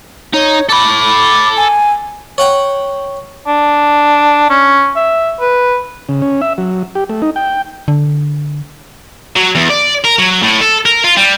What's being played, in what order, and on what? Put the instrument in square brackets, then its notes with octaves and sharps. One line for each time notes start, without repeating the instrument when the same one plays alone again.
[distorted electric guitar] D#4 [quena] C#5
[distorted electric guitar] A4 B5 [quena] D6
[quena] G#5
[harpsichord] C#5 F#5 G5
[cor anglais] D4
C#4
E5
B4
[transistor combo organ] C#3
C#4
E5
F#3
G4
A3
D#4
G5
[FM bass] D3
[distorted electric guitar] F#3
E2
D5
A#4
F#3
A2
A4
A#4
F4
G3